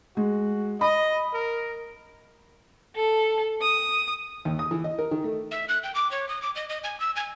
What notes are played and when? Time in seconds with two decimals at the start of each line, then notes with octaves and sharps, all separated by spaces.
0.17 G#3 F#4
0.81 D#5 B5
1.34 A#4
2.94 A4
3.61 D#6
4.45 D#2
4.59 D#6
4.71 E3
4.84 D#5
4.98 A#4
5.11 D#3
5.24 A3
5.51 E5
5.69 F#6
5.83 G5
5.95 D6
6.11 C#5
6.29 D#6
6.42 D6
6.56 D#5
6.69 D#5
6.84 G#5
7.00 E6
7.16 G#5